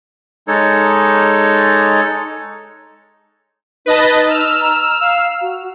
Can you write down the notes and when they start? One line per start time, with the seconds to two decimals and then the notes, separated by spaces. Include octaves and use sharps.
0.48 G#3 D#4 A4 C#5
3.86 D#4 B4 D#5 A5
4.28 E6 F6
4.61 A#5
5.01 F5
5.41 F#4